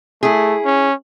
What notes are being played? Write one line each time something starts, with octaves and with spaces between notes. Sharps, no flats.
A3 E4 G#4
C#4